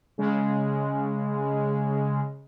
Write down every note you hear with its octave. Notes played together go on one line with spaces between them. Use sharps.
C#3 G#3